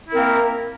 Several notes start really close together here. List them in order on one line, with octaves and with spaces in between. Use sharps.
E4 A#4 C4 A#3